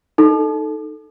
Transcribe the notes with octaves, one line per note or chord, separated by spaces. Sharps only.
D#4 A4